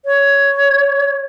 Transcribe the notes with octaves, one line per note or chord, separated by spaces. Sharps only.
C#5